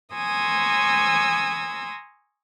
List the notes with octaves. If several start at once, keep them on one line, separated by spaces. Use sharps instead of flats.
G#5 A#5 C6 C#6 D#6 E6